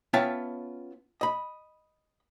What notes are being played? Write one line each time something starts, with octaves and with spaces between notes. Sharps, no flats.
B3 C#4 F4 E5 G5 A5
D#5 B5